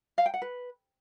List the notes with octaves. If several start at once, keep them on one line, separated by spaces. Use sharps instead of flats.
F5
G5
F#5
B4